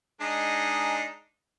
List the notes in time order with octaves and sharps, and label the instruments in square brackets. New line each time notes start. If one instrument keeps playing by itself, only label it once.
[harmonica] G#3 D4 D#4